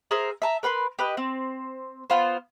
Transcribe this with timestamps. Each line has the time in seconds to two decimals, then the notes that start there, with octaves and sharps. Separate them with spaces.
0.11 G#4 A#4 C5 E5
0.42 E5 A5 A#5
0.63 A#4 B4 B5 C6
0.99 G4 B4 D#5
1.17 C4
2.10 B3 F4 C5